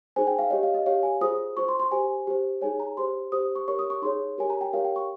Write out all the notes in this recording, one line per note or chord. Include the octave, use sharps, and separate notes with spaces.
D#4 G#4 C5 G#5
G5
F5
G4 C#5 D#5
F5
D#5
G4 C#5 F5
G#5
F4 G#4 C5 D#6
F4 C5 C#6
C6
C6
G4 C5 G#5
G4 C5
D#4 G#4 C#5 G#5
A#5
G4 C5 C6
G4 C5 D#6
C#6
G4 A#4 C#5 C#6
D#6
C#6
D#4 G#4 C#5 C6
G4 A#4 C#5 G#5
A#5
G5
G4 A#4 C#5 F5
G5
C#6